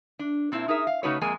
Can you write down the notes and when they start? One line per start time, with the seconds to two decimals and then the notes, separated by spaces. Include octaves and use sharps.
0.19 D4
0.52 A#2 C4 D4 E4
0.68 D#4 G#4 A#4 E5
0.87 F5
1.03 C#3 A3 D#4 F#4 B4 C#5
1.21 F2 G#3 A#3 G#5